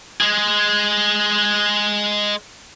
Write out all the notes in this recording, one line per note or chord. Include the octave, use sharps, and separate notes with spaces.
G#3 G#4